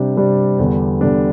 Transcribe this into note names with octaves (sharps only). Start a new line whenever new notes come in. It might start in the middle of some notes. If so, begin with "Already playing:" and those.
Already playing: C3 G3 D4 G4
C3 G3 D4 G4
E2 D3 G3 D4
E2 D3 G3 D4